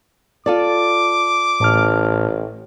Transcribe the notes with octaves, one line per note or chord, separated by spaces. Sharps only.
F4 A4 D5 D6
A1 A2 A5 F6